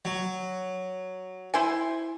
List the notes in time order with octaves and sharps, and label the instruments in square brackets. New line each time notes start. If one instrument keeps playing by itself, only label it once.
[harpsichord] F#3
[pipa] E4 C5 G#5